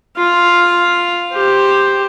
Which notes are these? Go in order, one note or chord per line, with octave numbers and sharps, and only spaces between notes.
F4 F5
G4 C5